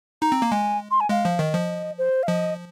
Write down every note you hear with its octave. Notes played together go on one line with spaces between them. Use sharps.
D#4 A#5
C4
A#3
G#3 G#5
C6
G#5
G#3 F5
F3
D#3 D#5
F3
C5
F5
F3 D#5